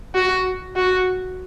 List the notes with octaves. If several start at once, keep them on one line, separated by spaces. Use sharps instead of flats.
F#4
F#4